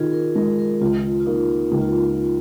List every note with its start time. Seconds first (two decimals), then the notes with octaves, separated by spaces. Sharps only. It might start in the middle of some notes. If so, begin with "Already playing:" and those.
Already playing: D#3 F4 G#4
0.13 A#4
0.35 G#3 A#4
0.59 A#4
0.81 C#2 F4
1.20 F4
1.26 A#3 D#4
1.71 C#2 D#4
1.81 F4